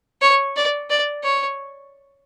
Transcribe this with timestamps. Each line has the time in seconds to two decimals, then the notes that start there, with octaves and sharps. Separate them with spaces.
0.21 C#5
0.56 D5
0.90 D5
1.23 C#5